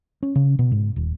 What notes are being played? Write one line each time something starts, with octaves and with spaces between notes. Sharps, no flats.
C#4
C#3
B2
G#2
D#1